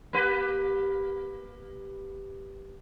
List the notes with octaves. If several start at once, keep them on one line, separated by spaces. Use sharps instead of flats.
A#3 G4 B4